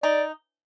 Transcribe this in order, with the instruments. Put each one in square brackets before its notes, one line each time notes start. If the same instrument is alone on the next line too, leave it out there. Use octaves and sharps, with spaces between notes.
[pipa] D#4 [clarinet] D5